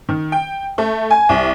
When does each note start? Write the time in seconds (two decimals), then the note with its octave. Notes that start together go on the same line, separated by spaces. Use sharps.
0.09 D#3
0.32 G5
0.78 A3
1.11 G#5
1.29 C2